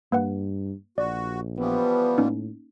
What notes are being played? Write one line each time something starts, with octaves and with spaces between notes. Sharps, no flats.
G2 A#3 B4 F#5
A#1 F#4 D5
E3 F3 G3 B3
A2 A#3 C#4 D#4